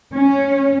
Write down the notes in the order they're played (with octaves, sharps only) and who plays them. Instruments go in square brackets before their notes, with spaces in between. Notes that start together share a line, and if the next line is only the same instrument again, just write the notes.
[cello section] C#4